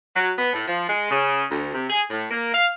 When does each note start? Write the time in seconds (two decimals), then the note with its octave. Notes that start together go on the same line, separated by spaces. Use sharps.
0.16 F#3
0.38 B3
0.53 A2
0.68 F3
0.89 G#3
1.10 C#3
1.50 D2
1.74 C3
1.90 G#4
2.10 A2
2.30 A#3
2.54 F5